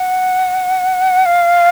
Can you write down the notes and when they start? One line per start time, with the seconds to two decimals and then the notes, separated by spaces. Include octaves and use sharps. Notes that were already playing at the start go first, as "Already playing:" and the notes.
Already playing: F#5
1.26 F5